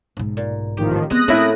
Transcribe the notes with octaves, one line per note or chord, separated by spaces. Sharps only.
B1 G#2
A#2
A1 D#3 F3 G4
G#3 B3 C4 D#6 F#6 A#6
A2 A3 A#3 C4 C#4 E4